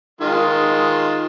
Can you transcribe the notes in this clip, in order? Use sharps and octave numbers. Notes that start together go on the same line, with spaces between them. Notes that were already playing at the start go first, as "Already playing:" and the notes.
D#3 G#3 F4